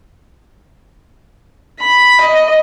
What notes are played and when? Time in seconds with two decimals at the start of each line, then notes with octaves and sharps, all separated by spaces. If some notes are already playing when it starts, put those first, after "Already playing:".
1.80 B5
2.21 D#5